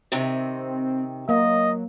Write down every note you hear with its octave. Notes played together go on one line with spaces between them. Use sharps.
C3 D#3 C4
F#3 A#3 D#5